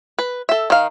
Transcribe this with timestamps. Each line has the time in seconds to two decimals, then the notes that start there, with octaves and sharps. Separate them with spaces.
0.19 B4
0.49 A4 E5
0.70 D#3 F5